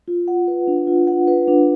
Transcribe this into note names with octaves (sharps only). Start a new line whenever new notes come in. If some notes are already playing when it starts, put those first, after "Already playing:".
F4
F#5
B4
D4
F4
F#5
B4
D4